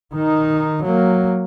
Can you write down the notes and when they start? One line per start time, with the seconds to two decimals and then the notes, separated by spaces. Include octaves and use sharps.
0.14 D#3 D#4
0.83 F#3 A#3